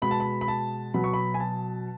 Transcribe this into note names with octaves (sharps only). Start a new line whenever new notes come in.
B2 G#3 B5
A5
B5
B5
A5
B2 F#3 B5
C#6
B5
G#5
A5